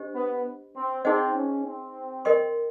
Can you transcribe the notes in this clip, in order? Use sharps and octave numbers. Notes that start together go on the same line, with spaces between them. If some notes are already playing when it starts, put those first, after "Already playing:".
Already playing: D4 G4 C5 D#5
B3
C4
C4 D#4 G#4 C5 D#5 F#5
C#4
C4
A#4 D#5 G5 C6